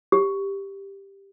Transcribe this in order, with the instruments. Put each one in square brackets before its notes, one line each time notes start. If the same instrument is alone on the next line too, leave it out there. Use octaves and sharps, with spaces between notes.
[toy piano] G4